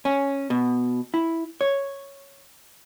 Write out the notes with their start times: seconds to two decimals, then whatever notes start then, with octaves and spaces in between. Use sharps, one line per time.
0.05 C#4
0.50 B2
1.14 E4
1.61 C#5